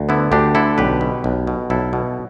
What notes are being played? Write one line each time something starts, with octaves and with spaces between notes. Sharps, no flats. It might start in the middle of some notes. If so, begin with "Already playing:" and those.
Already playing: D2
D3 B3 E4
D2 D4 G4
D3 E4 A4
B1 G4 B4
B2
B1
B2
B1 E4 A4
B2